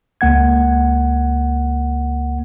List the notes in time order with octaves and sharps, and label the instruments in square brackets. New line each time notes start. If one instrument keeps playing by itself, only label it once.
[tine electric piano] C#2 A#3 F#5 G#6